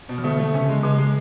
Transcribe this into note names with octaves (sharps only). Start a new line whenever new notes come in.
B2
E3
D3 A3
A3
C#3 C#4
G#3
C#3 G#3
G#3